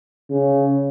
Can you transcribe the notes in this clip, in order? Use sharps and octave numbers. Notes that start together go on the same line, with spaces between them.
C#3